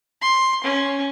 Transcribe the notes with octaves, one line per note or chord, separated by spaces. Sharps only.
C6
C#4